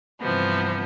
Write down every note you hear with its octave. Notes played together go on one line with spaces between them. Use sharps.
G2 C3 E3 F3 B3